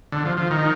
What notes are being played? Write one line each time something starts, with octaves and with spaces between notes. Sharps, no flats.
D3
F3
F3
D#3